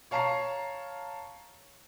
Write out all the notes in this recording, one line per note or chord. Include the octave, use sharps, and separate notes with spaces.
C#5 F5 A5 A#5 C#6 C7